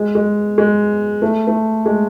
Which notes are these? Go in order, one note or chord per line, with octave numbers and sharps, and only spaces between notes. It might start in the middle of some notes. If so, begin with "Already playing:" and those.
Already playing: G#3
G#3
G#3
A3
A3
G#3